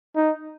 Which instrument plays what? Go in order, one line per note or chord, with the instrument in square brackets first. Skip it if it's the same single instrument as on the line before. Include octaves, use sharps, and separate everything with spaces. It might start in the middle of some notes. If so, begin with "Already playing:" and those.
[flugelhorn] D#4